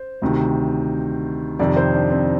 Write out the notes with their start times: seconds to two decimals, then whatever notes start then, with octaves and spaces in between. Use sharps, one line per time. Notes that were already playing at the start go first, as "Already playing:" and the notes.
Already playing: C5
0.22 D2 C3 D#3
1.59 F2 C3 D#3 D5
1.76 C5
1.94 D4
2.10 C4